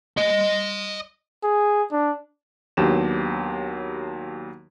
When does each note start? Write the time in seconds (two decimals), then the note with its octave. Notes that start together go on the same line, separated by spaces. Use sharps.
0.17 D#5 C6
1.43 G#4
1.92 D4
2.77 D#2 F#3 B3 D4 G4 E7